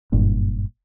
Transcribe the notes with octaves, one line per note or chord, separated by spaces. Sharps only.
F#1 G2 A#2